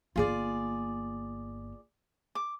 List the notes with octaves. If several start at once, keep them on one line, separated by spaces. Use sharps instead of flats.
G1 A#3 F4 G#4 D5
D6